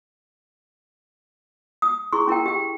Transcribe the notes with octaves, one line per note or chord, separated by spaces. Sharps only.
D#6
E4 G#4 C6 C#6
C#4 E4 A#4 G5
G4 G5